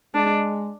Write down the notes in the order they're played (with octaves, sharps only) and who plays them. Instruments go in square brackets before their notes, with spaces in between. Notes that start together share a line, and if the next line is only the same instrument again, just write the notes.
[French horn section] G#3 [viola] D4